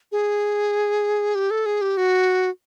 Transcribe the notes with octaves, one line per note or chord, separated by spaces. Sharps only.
G#4
G4
A4
G#4
G4
F#4